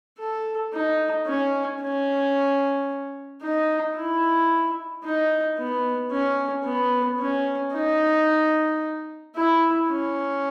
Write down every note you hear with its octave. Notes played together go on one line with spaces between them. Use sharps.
A4
D#4
C#4
C#4
D#4
E4
D#4
B3
C#4
B3
C#4
D#4
E4
C#4